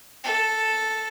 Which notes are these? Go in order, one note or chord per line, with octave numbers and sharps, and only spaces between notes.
A4